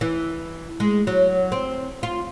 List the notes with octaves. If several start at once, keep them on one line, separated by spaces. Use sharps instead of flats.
E3
G#3
F#3
C4
F4